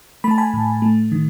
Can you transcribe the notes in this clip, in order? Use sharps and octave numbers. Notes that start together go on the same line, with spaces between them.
A3 B5
A5
G#5 B5
A2
A3
D#3